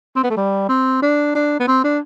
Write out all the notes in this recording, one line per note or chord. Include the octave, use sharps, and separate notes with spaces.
C4
B3
A3
G3
C4
D4
D4
B3
C4
D4